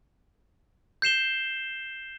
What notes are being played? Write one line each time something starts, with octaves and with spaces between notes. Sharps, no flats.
G6 C7 E7 G7